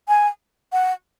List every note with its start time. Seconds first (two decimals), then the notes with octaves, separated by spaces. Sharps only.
0.08 G#5
0.73 F#5